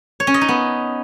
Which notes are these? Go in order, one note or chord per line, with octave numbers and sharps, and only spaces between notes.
C#5
C#4
D#5
D#4
B3